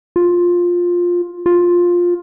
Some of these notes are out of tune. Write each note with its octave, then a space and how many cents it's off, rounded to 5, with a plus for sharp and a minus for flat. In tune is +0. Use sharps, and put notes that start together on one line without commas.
F4 +10
F4 +10